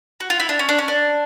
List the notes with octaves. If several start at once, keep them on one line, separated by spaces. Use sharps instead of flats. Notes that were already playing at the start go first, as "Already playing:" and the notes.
F#4
F4
E4
D4
C#4
D4
C#4
D4